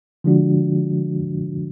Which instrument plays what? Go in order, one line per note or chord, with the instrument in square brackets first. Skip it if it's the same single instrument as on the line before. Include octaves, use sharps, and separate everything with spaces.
[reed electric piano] D3 F3 G#3 D4 F#4